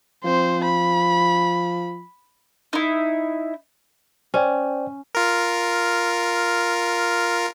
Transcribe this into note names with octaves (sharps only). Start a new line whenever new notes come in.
F3 C4 C5
B5
D#4 E4
C#4 C5 D5 G5
F4 A#4